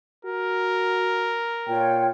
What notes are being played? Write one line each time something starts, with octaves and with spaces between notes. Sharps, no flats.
F#4 A#4
A#2 F4 C#5 G5